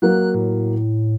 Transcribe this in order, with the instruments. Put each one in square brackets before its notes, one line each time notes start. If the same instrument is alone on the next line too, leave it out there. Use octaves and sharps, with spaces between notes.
[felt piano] F#3 A#3 [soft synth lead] F#6
[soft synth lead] A2